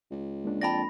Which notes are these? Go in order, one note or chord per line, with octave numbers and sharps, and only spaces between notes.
C#2
G#3 A#3 D4
F2 D5 G5 A5 B5 A#6